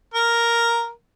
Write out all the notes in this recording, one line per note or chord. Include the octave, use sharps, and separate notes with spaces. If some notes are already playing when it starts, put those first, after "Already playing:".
A#4